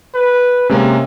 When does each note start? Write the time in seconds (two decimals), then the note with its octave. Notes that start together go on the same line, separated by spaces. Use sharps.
0.14 B4
0.69 C3 G#3 A#3 C#4